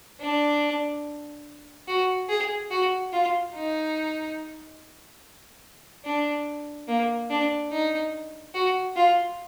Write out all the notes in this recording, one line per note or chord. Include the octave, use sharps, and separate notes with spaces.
D4
F#4
G#4
F#4
F4
D#4
D4
A#3
D4
D#4
F#4
F4